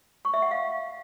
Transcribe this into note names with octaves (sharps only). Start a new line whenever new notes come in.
C#6
E5
F#5
F5